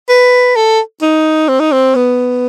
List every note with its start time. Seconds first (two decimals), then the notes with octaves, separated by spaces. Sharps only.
0.09 B4
0.56 A4
1.02 D#4
1.48 C4
1.60 D#4
1.72 C4
1.96 B3